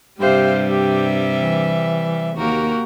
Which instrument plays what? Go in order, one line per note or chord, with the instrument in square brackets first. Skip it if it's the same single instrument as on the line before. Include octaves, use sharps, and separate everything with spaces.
[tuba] G2 [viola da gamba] C3 G3 [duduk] G4 [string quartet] C5 E5 F5
[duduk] G4 [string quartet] E5
[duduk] E3
[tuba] D#2 [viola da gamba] A#3 [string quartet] F#4 G4 A#4